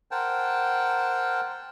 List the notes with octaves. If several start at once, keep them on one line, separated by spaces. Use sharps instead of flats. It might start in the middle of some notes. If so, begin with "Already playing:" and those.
A#4 C5 F#5 G5 A5